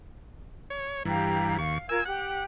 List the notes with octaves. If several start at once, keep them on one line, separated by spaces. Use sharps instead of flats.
C#5
G2 E3 G4 F5 A#5
D#2 F5 C#6
F4 A#4 G#5 E6 G#6
G4 F#5